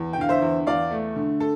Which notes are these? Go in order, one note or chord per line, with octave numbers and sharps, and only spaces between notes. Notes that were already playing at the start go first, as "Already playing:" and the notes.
Already playing: E2
G5
D3 F5
C5 E5
E2
E2 D5 F5
A3
D3
A4